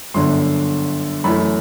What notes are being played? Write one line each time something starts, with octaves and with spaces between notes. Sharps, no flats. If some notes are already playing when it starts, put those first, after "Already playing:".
G1 F#2 D3 C6
F#2 E3 A3 B5